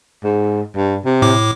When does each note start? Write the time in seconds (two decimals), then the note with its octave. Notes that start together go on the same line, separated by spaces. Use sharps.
0.24 G#2
0.76 G2
1.05 C3
1.22 A2 D6